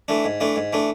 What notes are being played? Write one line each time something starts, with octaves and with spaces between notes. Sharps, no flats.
E3 A3 D4
G#2
E3 A3 D4
G#2
E3 A3 D4